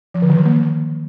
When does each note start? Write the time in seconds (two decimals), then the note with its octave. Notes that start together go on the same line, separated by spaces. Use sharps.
0.14 F3
0.22 D3
0.30 D#3
0.37 F#3
0.45 A#3